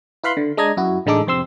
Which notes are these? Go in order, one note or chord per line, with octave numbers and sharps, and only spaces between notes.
E4 B4 F5 B5 C6
D3
G#3 D4 D#5 A#5 G#6
F#2 E4 F#4
A1 D3 G#3 D#4 A4 D6
F2 C3 C4 C6 E6